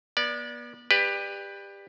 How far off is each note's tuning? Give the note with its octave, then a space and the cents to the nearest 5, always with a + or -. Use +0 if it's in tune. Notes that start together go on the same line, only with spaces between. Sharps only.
B3 -40 D5 +0
G4 +25 B4 +0 D5 +20